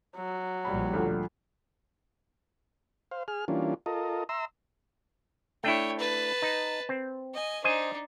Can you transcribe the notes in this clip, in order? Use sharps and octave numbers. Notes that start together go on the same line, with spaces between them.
F#3
A#1 G3 B5
D2 F3
C5 F5
G#4 F6
E3 G3 A#3 C#4 D4 F4
F4 A4 A#4 D#5
E5 A#5 C6 E6
A3 D4 E4 C#5 G5
B4 A5
D#4
C4
D#5 G#5
D4 D#4 C5 D#5 G#5